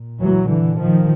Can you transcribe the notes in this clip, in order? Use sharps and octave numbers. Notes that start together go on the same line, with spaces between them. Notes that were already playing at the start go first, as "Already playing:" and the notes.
Already playing: A#2
E3 F#3
D3 E3
D#3 F3